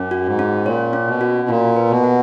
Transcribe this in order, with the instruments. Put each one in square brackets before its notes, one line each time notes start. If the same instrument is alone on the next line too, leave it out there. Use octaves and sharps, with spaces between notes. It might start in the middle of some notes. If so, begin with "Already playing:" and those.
Already playing: [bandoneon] F#2 [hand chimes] C#4
[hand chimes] F#4
[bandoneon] G#2
[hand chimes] C#4
[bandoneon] A#2 [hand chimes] C#5
[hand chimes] C#4
[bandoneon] B2
[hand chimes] F#4
[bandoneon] A#2 [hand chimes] F4
[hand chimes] B4
[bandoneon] B2
[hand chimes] F#5